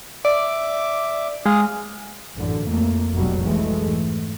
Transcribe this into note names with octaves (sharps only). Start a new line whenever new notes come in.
D5 E5 D6
G#3 F5 D#6 F6
A1 F#2 D3
F2 A3 A#3
F1 B1 F#2 B2 F#3 G3
F2 E3 G#3 A3
G#2